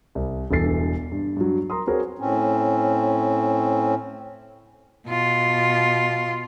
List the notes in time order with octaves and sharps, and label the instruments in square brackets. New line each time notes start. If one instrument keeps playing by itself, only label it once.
[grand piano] C2
E1 G2 E3 A4 A6 C7
G2
G2 F#3
A#4 A#5 C6 D#6
C4 F#4 G#4 A#4 B4 C#5
[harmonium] A2 C4 C#4
[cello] B2 F4